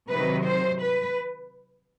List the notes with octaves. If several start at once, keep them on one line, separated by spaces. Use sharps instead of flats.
C3 D#3 F#3 B4
C5
B4